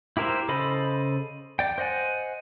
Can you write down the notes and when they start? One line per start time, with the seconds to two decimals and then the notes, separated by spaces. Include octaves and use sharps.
0.17 E4 G4 A#4 C5 E5
0.48 C#3 A4 C5 D#5 B5
1.59 D5 G5
1.78 C5 D#5 F#5 G#5